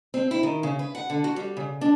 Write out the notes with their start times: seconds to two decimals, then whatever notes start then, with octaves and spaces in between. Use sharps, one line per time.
0.14 C4
0.31 E4
0.43 D#3
0.63 C#3
0.79 B4
0.95 F#5
1.10 D3
1.24 F#4
1.36 G3
1.57 C#3
1.81 D4